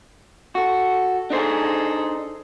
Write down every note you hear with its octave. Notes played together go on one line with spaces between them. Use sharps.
F#4 A4
D4 D#4 G#4 A4 C5